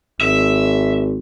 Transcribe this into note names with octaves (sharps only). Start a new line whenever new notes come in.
G#1 E5